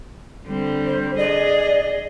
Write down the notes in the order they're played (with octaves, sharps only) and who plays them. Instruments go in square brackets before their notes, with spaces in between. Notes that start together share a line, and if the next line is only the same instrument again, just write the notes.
[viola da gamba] D3 G3 C4
[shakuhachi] C5
[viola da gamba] G#4 D#5 [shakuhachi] D5